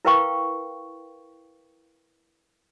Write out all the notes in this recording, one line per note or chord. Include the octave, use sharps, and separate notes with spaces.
E4 A#4 B4 F5 G5 C#6